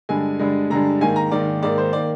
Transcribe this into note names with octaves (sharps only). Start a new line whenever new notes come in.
G2 D3 G#3 G#5
G2 D3 G#3
G2 D3 G#3 A#5
G#2 D#3 A#3 G#5
A#5
G#2 D#3 A#3 D5
G#2 D#3 A#3 D5
C5
D#3 A#3 D5